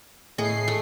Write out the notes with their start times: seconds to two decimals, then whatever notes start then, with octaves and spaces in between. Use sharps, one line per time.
0.38 A2 G#4 D#5 C7
0.68 A3